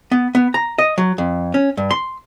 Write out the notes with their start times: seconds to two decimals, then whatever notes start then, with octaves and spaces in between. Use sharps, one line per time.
0.11 B3
0.35 B3
0.54 A#5
0.78 D#5
0.98 F#3
1.18 F2
1.54 C#4
1.77 G2
1.91 C6